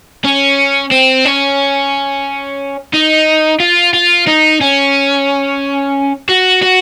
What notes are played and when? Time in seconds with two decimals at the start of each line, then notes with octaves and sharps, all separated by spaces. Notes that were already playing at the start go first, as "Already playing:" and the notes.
0.24 C#4
0.91 C4
1.25 C#4
2.93 D#4
3.60 F4
3.93 F4
4.27 D#4
4.61 C#4
6.29 F#4
6.62 F#4